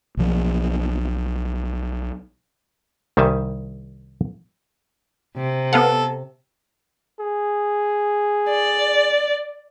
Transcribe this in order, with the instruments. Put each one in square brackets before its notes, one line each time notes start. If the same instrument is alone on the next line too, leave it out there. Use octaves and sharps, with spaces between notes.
[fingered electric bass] B1 F3
[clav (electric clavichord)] C2 D#3 G3 E5 G#5 A5
[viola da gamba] C3
[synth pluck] B3 F5 F#5 [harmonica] A4
[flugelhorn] G#4
[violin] D5